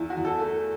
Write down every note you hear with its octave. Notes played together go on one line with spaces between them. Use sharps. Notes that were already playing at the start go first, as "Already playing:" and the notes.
Already playing: E2 E4
F#4
E2
A4
A3